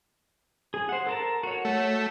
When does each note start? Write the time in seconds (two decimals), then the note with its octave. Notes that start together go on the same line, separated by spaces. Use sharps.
0.74 G#4
0.89 C5 F#5
1.07 A4 A#4 A5
1.43 F#4 C#5
1.65 A3